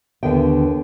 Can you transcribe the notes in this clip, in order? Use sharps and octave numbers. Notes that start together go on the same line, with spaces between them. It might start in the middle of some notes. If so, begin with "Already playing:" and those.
D#2 D3 B3 G5